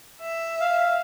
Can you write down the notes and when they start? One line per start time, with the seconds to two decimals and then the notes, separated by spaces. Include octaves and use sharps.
0.21 E5
0.61 F5